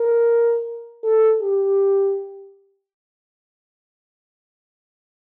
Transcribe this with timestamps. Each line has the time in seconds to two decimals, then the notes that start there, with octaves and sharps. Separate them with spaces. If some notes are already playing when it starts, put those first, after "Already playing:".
Already playing: A#4
1.04 A4
1.42 G4